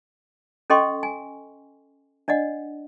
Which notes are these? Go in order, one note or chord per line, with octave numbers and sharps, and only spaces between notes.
C#4 A4 D#5 G5 C6 C#6
G#5
D4 D5 D#5 F#5